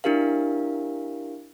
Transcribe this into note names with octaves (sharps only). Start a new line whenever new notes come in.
D4 E4 G4 A#4 F5